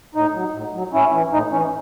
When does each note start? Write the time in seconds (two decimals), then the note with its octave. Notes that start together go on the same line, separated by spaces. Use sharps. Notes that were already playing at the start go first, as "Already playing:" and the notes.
0.15 A2 D#4
0.34 F#3
0.54 A2
0.73 F#3
0.93 A2 C#4 E4
1.13 E3
1.32 A2 D#4
1.51 E3 C#4